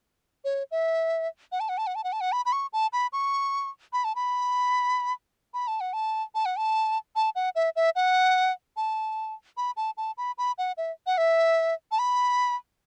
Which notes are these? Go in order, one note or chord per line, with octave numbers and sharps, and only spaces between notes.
C#5
E5
F#5
A5
F#5
A5
F#5
A5
F#5
A5
F#5
B5
B5
C#6
A5
B5
C#6
B5
A5
B5
B5
A5
F#5
A5
A5
F#5
A5
A5
F#5
E5
E5
F#5
A5
B5
A5
A5
B5
B5
F#5
E5
F#5
E5
A5
B5